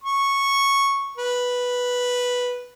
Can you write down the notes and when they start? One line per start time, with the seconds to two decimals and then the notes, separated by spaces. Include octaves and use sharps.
0.04 C#6
1.17 B4